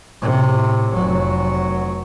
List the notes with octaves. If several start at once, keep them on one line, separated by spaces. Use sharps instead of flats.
A2 C3
F1 F#3